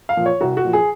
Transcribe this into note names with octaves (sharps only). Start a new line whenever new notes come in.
F5
A#2 F3
C#5
C2 F#4
F#4
A#2 F3
G#4